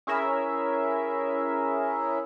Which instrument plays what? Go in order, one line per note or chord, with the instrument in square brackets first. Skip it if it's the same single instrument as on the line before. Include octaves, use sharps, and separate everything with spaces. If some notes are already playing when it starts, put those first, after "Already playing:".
[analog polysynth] C#4 E4 G#4 A#4 E5